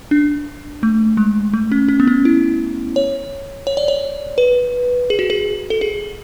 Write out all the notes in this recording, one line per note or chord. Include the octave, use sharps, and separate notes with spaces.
D4
A3
G#3
A3
C#4
C#4
B3
C#4
E4
C#5
C#5
D5
C#5
B4
G#4
F#4
G#4
A4
G#4